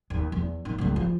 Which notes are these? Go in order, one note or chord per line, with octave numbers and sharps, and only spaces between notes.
D#2
E2
D#3
C#2 F#2
F3